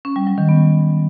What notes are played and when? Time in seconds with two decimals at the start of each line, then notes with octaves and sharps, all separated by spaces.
0.05 C#4
0.16 G3
0.27 F#3
0.38 D#3
0.49 B3